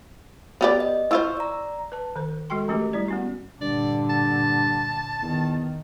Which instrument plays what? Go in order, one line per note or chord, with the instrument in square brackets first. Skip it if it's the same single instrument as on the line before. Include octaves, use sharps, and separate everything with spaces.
[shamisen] B3 G4 D5
[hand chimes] D#5
[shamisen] E4 F4 C5 [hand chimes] C#6 E6
[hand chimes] D5 A#5
[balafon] B4 A5
D#3 C5
G#3 F#4 A4 G5 C6
E3 A3 C#4 G4 A#4
G3 E4 D5
B3 C#4 F#4
[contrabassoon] G2 [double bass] A#2 D3 [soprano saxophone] D5
[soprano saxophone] A5
[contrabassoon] E2 [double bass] D#3